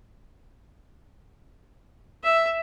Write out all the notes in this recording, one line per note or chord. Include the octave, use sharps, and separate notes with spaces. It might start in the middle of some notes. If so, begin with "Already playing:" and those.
E5